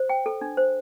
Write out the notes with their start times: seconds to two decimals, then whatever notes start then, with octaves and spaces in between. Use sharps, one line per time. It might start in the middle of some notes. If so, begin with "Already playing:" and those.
Already playing: C5
0.09 G5
0.26 A4
0.41 D4
0.57 C5